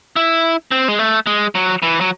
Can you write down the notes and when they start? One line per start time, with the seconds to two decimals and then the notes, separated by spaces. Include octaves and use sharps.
0.16 E4
0.71 C4
0.88 G#3
0.99 A3
1.27 G#3
1.55 F#3
1.83 E3
2.01 F#3